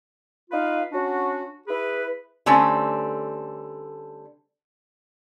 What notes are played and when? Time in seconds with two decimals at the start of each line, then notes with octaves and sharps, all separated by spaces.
0.50 D#4 F4 B4 F5
0.92 C#4 D4 F#4
1.68 E4 G#4 B4
2.46 D3 G3 A3 C4 C#4 B4